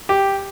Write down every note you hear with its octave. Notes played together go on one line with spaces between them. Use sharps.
G4